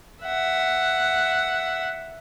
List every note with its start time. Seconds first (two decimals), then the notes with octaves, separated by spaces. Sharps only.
0.24 E5 F#5